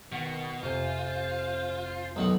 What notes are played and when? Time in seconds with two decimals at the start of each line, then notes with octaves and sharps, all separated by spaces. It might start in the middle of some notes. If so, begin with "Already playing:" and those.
0.12 B2 D#3 F#5
0.63 F2 C3 F4 C5 G#5
2.16 B1 D#3 F#5